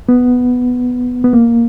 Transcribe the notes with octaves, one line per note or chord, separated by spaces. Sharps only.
B3
B3
A#3